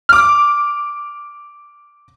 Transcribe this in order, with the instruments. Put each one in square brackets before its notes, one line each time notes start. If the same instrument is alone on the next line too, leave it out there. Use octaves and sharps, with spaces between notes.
[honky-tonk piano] D6 F6